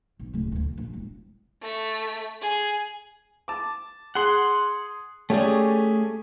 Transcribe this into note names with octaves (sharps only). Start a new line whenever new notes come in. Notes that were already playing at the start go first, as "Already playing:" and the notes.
B1
D1 C#3
D2 D3
A#2
A#1
E1
A3 B6
G#4
A5 D6
G#4 F#5 C6
A3 C#4 G4 G#4 D5